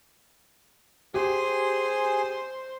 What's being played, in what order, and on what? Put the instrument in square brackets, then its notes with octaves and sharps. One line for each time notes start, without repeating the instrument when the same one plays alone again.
[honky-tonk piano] G4 [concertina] G#4 G#5 [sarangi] C5